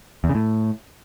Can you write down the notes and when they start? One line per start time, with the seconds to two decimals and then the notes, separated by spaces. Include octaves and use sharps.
0.24 E2
0.29 C#3
0.35 A2